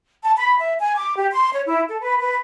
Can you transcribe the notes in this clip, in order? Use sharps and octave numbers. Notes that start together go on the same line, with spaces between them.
A5
B5
E5
G#5
D6
G4
C6
C#5
E4
A4
B4
B4